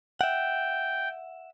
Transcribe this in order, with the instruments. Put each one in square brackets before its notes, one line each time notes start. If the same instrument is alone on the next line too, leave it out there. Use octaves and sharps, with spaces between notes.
[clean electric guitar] E5 F#5 [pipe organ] G5